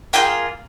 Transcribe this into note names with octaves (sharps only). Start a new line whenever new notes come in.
A#3 F4 G#4 G5